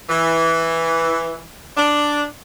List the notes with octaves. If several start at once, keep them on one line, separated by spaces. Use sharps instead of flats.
E3
D4